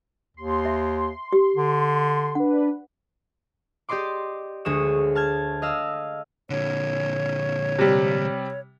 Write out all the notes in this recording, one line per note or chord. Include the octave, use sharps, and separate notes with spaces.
D#2 C6
E5
G4
D3
D4 B4 F#5
G4 D5 D#5 C6 D6
D2 G#3 C#5 D#6 E7
A5 F6 G#6
D#5 F5 E6 F6
A#2 D3 C#5
C3 G3